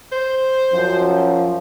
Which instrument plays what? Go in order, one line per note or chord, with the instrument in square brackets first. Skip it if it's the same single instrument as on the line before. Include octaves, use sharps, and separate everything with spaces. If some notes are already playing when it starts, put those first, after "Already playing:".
[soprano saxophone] C5
[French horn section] F#2 F3